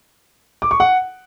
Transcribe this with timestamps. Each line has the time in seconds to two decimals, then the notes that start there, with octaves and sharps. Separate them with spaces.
0.62 D6
0.71 C#6
0.80 F#5